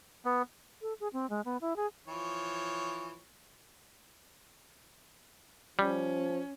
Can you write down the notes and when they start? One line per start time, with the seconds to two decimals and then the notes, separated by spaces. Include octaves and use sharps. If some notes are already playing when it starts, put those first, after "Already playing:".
0.25 B3
0.82 A4
1.00 G#4
1.13 C4
1.30 G#3
1.45 B3
1.61 E4
1.76 G#4
2.08 E3 F3 C#5
5.79 F3 G3 C#4